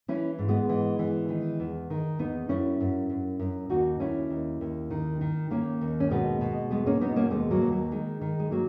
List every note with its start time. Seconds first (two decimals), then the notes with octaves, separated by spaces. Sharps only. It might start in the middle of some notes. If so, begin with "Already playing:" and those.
0.08 E3 C#4 E4
0.39 G#2
0.49 G#3 B3
0.69 E3
0.99 E3
1.29 D#3
1.60 E2
1.90 D#3
2.19 E2 B3 D#4
2.49 F#2 C#4 E4
2.81 F#2
3.10 F#2
3.40 F#2
3.70 D#2 D#4 F#4
4.00 D#2 C#4 E4
4.30 D#2
4.61 D#2
4.90 D#3
5.21 D#3
5.50 D#3 A#3 C#4
5.81 D#2
6.00 C#4
6.10 B2 G#3 B3
6.41 B2
6.71 E2 G#3 B3
6.86 A#3 C#4
7.01 B2 B3 D#4
7.16 A#3 C#4
7.31 D#2 G#3 B3
7.51 F#3 A#3
7.62 D#2
7.72 F#3
7.92 D#3 G#3
8.21 D#3
8.40 G#3
8.51 F#3 A#3